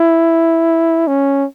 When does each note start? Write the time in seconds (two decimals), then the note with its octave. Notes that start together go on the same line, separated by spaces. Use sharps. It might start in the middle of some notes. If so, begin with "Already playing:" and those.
Already playing: E4
1.08 C#4